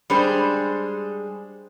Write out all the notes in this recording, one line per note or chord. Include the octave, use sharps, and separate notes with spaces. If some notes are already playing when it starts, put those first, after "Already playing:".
G3 G#3 D4 G#4 C5